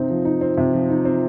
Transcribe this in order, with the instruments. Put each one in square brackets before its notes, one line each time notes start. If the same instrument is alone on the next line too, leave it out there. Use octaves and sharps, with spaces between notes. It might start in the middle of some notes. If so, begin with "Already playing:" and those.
Already playing: [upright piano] C3 C4 D#4
F3
D#4
C4
C3
F3
D#4
C4